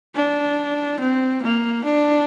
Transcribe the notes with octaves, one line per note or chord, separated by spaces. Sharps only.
D4
C4
A#3
D4